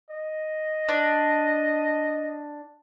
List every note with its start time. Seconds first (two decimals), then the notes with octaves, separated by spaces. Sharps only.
0.10 D#5
0.89 D4